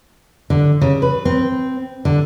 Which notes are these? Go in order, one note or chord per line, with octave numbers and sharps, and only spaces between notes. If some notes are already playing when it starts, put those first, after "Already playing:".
D3
C#3
B4
C4
D3